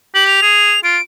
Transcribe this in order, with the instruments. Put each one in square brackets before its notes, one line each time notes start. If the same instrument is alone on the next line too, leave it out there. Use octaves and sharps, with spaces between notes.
[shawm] G4 [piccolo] F#7
[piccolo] F7
[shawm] G#4
[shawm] F4 [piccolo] D7